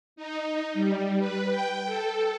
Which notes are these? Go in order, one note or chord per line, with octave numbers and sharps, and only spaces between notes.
D#4
G3
B4
G5
A4